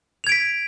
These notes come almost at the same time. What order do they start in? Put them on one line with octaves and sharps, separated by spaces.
F7 G#6 D7 B6